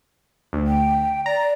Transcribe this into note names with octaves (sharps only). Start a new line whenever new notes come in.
D2
G5
D5 A#5